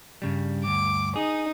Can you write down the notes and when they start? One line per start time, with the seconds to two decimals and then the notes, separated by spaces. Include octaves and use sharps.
0.22 G2 C#3 G3
0.65 D2 G2 D6
1.16 D#4 G#4